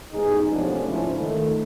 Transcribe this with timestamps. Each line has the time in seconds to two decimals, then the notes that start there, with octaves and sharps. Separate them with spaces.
0.13 A1 G#2 B3 D#4 G#4
0.52 C3 F3 A3 B3 C#4 D4
0.84 G#2 C#3 F3 C#4 E4 F4
1.18 D#3 A3